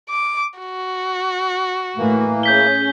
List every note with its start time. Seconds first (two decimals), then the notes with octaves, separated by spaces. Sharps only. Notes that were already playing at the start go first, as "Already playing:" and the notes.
0.10 D6
0.59 F#4
1.98 A2 E3 A#3
2.43 C#4 G#4 G6 B6 G7